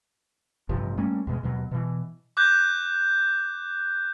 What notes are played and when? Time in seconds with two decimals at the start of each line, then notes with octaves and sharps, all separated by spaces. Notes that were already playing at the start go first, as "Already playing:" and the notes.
0.69 A1 G2 C3 F3
0.97 G3 A3 A#3 C#4
1.27 E2 B2 G#3
1.43 D#2 B2 F#3
1.71 B2 E3
2.37 D6 F#6 G6